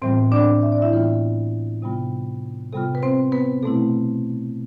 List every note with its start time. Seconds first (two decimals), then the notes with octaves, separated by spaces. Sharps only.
0.02 A2 E3 G3 B3 C4 F4 C5
0.32 D4 D5
0.62 E5
0.72 D5
0.82 E4 E5
0.92 A2 E3 G3 B3 F4
1.82 C3 G3 B3 F4
2.73 C3 G3 B3 F4 A4
2.95 B4
3.03 C4 C5
3.32 B3 B4
3.63 B2 A3 C4 E4 A4